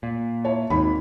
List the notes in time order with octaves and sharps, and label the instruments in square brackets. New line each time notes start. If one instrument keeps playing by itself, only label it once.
[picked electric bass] A#2
[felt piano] E4 C#5 A5
[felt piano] G#1 B5 [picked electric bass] D#2